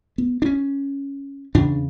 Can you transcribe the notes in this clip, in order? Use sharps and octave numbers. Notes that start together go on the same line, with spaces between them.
B3
D4
C#4
E2 C#3 D4